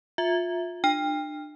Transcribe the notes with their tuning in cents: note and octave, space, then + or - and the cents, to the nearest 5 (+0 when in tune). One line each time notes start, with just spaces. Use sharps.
F4 +20 E5 +0
D4 +35 G5 +30